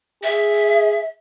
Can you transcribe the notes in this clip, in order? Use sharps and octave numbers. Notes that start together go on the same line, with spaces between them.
G#4 E5